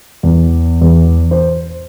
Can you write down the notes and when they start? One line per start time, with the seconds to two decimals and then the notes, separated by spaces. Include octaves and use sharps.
0.23 E2
0.81 E2
1.31 C5